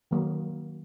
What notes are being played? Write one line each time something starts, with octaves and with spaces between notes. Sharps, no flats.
D#3 F#3 A#3